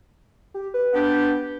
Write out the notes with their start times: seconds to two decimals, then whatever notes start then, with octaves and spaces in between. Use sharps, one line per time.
0.54 G4
0.74 B4
0.93 B3 D4 G4